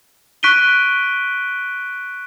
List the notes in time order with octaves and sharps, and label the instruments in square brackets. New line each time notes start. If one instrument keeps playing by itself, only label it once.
[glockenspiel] C#6 F#6 B6 D7 D#7 G7